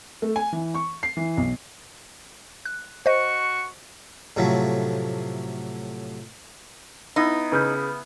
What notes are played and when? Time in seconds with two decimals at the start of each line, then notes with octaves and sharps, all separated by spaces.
0.22 A3
0.36 G#5
0.52 E3
0.74 C#6
1.03 C7
1.17 E3
1.37 B1
2.66 F#6
3.06 F#4 C5 D#5 C#6
4.37 A2 C3 F3 F#3 A3
7.16 B3 D#4 E4
7.52 C#3 B4 F6 G6